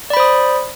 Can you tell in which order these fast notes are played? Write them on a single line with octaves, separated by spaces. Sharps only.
D5 B5 C5 D#6